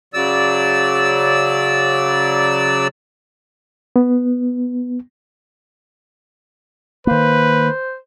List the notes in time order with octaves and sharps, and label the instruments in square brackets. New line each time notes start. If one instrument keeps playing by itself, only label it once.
[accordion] C#3 F#3 D5 E6
[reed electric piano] B3
[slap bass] D#3 A#3 [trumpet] B4 [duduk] C5